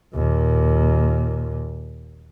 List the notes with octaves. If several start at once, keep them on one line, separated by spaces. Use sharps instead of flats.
D#2 A#2